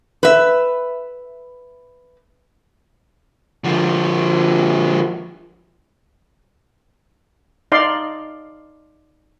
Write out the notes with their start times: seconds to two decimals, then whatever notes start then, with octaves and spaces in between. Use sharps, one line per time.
0.23 B4 E5
3.64 D3 F3
7.72 D#4 D5 F5 C6